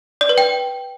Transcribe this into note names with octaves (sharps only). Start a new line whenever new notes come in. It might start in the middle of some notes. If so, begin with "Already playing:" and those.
D5
B4
G5